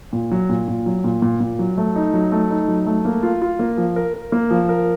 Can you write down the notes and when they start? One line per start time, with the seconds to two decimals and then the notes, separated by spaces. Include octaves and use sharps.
0.13 A#2
0.31 F#3
0.49 A#2
0.68 A#2
0.86 F#3
1.04 A#2
1.22 A#2
1.40 A#2
1.59 F#3
1.78 A3
1.95 D#4
2.13 F#3
2.32 A3
2.50 D#4
2.68 F#3
2.86 A3
3.05 A#3
3.23 F4
3.42 F4
3.59 A#3
3.77 F3
3.96 A#4
4.14 A#4
4.32 A#3
4.51 F3
4.69 A#4